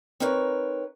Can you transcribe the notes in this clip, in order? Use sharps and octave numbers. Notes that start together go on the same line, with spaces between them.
C4 D#4 A#4 B4 C#5